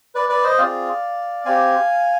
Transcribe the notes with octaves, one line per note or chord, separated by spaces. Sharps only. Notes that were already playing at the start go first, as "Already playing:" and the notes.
B4 D5
B4 D5
C5 D#5
C4 F4 G#4 D5 F5
C4 G4 F5 G#5